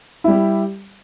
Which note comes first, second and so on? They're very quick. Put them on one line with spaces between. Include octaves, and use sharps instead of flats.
E4 G3 G4